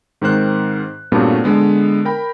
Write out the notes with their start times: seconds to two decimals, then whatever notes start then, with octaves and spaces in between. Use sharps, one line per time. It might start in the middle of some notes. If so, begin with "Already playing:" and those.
0.22 G#2 D#3 C4 C5 F#6
1.12 G2 A#2 F#3 A3 B3 C4
1.44 D3 G#3 B3
2.05 A#4 G5 B5